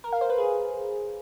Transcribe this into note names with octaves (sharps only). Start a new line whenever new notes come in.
A#4
F5
C5
B4
G#4